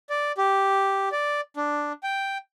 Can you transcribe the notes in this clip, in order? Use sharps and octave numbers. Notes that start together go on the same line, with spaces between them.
D5
G4
D5
D4
G5